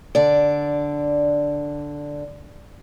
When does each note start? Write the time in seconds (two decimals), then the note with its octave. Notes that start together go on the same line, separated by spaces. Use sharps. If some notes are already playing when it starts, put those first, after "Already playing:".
0.15 D3 D5